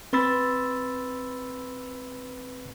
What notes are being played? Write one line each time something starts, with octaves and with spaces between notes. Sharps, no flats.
C4 B4 B5 C6 E6 A6